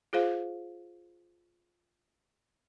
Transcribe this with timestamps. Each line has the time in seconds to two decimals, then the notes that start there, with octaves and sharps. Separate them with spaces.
0.13 F4 G#4 C5 F5